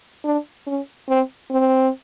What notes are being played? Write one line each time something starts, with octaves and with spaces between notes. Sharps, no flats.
D4
C#4
C4
C4